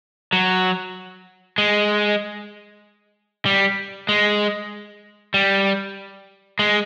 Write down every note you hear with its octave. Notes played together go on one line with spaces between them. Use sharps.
F#3
G#3
G3
G#3
G3
G#3